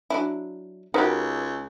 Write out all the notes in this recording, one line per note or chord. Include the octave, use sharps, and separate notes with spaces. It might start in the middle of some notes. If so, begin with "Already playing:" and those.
F#3 D4 E4
C#2 D#4 F#4 G4 A#4 B4